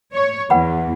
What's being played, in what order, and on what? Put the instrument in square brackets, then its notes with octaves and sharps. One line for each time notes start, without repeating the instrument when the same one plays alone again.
[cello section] C#5
[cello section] E2 [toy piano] B4 F#5 B5